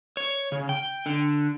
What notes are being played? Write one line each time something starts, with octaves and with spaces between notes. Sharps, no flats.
C#5
C#3
G5
D3